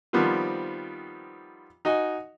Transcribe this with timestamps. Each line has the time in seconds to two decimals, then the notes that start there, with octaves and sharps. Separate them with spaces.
0.13 D#3 F3 G3 B3 C4 F4
1.85 D#4 F#4 D#5 G#5